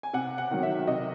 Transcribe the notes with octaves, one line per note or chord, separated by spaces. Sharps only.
G#5
C3 F#5
F#5
D#3 F#3
E5
C3 D#5